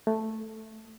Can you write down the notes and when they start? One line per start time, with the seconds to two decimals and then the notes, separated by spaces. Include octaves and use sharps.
0.07 A3